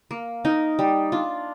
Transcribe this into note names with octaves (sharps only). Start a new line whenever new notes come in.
A#3
D#4 A#4
G3
D4 F4